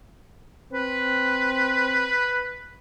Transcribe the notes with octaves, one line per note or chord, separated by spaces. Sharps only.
C4 B4